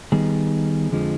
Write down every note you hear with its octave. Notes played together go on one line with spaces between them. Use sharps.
D#3 G3 B3 D#4 G#4
F2 D3 F3 G#3